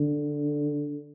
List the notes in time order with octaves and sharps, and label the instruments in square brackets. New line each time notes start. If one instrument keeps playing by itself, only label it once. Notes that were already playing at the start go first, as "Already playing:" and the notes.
Already playing: [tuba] D3